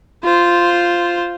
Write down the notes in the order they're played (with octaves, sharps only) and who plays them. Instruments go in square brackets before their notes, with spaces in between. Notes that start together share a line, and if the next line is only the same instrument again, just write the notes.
[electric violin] F4 C5